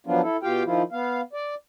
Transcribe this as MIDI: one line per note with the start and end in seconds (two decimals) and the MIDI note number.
0.07 0.21 53
0.07 0.21 54
0.07 0.21 59
0.07 0.21 62
0.07 0.21 65
0.23 0.37 64
0.23 0.37 69
0.43 0.63 47
0.43 0.63 65
0.43 0.63 67
0.43 0.63 77
0.43 0.63 79
0.65 0.82 51
0.65 0.82 53
0.65 0.82 64
0.65 0.82 65
0.92 1.21 59
0.92 1.21 77
1.33 1.55 74